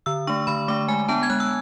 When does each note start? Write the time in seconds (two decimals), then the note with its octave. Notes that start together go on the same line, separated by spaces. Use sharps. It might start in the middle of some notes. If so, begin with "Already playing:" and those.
0.06 D3 E6
0.27 A3 D4 C#6
0.47 D3 B5
0.68 A3 D4 D6
0.88 G#3 G#5
1.08 B3 D4 A5
1.23 G#6
1.30 G#3 F#6
1.40 E6